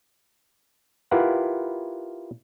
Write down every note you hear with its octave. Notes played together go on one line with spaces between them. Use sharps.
E4 F4 G4 A#4 B4 F#5